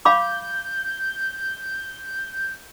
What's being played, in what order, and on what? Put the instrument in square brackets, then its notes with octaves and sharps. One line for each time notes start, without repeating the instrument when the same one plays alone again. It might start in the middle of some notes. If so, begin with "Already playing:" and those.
[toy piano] F5 B5 D6 [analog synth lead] G6